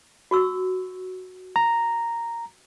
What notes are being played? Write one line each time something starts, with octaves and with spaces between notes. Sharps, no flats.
F#4 C#6 E6
A#5